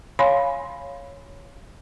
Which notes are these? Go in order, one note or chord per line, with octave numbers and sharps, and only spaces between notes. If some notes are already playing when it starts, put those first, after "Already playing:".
C#5 F5 G#5 B5 C6